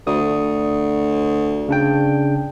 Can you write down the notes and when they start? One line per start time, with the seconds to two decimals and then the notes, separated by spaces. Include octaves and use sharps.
0.07 D2 D#6
1.69 C#3 D4 G5